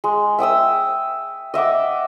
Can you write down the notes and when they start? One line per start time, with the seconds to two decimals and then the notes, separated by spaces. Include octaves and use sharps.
0.04 G#3
0.38 E5 G5 D#6 E6
1.54 D#5 E5 F#5 D6